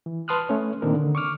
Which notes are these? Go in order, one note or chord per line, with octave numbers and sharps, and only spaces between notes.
E3
B4 A5 C6 D#6 F6 F#6
A3 C#4 C#5
A#2 D#3 A#3 C4 D4 A#4
D3
C#6 D6 F6